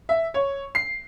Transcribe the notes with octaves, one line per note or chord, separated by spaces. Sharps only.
E5
C#5
C7